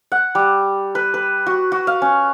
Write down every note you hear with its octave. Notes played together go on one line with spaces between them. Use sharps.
F#5
G3
B4
B4
F#4
F#4
F5
C#4